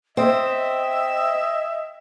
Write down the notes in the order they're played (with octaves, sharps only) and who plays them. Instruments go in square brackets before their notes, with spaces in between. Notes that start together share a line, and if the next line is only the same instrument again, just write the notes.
[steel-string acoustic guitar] C4 [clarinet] D#5 [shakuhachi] E5